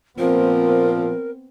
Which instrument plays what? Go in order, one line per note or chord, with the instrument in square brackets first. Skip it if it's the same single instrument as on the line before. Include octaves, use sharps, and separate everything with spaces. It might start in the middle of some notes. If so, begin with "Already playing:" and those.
[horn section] A#2 F3 [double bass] B3 C4 [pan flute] A#4